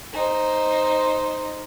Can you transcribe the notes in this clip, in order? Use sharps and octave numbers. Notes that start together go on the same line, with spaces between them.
D#4 C5